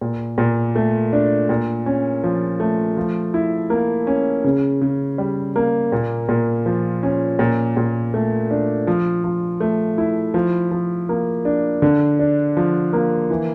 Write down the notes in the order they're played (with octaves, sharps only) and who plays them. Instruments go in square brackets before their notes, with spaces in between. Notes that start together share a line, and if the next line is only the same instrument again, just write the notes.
[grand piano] A#2
A#2
A3
D4
A#2
C#4
F3
A3
F3
E4
A#3
C#4
C#3
C#3
G3
A#3
A#2
A#2
F3
C#4
A#2
A#2
A3
D4
F3
F3
A3
E4
F3
F3
A#3
D4
D3
D4
F3
A#3
E3